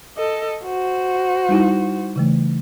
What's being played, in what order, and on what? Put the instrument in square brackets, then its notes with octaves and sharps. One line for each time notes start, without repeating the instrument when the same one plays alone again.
[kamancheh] A4 D#5
F#4 C5
[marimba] G3 D#4 E4
C#3 E3 A3